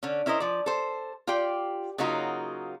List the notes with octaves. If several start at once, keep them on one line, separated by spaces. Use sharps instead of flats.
D3 C#4
C#4 E4 A#4 C5 D#5
F3 D5
A4 C5
F4 G4 D5 G5
C#3 F#3 A#3 D#4 F4 F#4